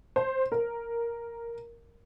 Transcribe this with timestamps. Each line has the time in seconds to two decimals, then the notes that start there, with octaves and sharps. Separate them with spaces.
0.16 C5
0.52 A#4